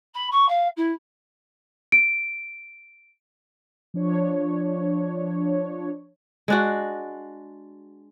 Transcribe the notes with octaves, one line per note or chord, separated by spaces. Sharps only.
B5
C#6
F5
E4
D7
F3 D4 C#5
G#3 D4 F#4